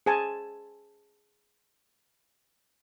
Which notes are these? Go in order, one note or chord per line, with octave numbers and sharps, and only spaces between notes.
G#4 C5 G#5 A5